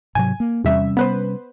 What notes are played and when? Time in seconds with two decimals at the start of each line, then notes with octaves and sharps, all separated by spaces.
0.15 G#2 C3 F#3 G#5
0.40 A#3
0.64 E2 C3 G3 C#4 E5
0.97 B3 B4 C5